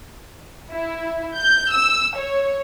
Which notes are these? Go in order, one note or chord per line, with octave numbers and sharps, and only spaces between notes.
E4
G6
E6
C#5